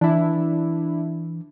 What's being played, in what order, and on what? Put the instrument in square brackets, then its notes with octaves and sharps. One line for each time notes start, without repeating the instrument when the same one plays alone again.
[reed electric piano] E3 [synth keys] D4 E4